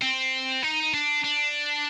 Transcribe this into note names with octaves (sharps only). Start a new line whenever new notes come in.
C4
D#4
D4
D4